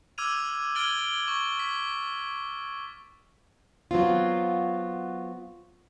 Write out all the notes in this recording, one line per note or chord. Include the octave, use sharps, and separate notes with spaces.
D6 E6 F6 G#6 D#7 F7
F6 G#6 A6 D7 F#7 G7
C#6
B6
F#3 B3 C4 F4